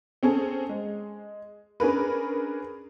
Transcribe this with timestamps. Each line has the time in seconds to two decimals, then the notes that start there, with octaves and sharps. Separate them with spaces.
0.23 C4 C#4 G#4 A4
0.69 G#3
1.80 C#4 D4 G#4 A#4 B4